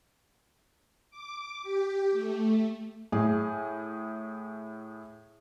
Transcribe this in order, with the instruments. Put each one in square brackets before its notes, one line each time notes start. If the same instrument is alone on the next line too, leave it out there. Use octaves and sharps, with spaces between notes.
[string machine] D6
G4
A3
[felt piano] A2 G#4